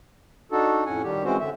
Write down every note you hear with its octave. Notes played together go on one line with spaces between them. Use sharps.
D4 D#4 F#4 A4
F2 A2 C#4 F#5 G#5
D#3 G3 G4
E3 G#3 C4 C#4 F#4 C5
D3 E5